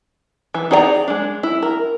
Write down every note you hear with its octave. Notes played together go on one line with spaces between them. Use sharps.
E3
D#4 G#4 D5 G5 A#5
G#3 D4
E4
A#4